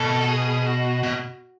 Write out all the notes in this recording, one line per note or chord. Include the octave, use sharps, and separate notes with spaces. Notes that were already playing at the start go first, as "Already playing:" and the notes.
Already playing: B2 A4
G#4
F#4
B2